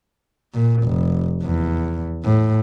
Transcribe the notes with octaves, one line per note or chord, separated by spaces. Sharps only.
A#2
F1
E2
A2